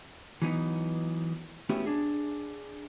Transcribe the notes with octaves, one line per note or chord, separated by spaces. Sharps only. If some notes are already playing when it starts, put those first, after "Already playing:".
E3 F#3 B3 D#4
A3 B3 C#4 E4 F#4 G4
D4 G#4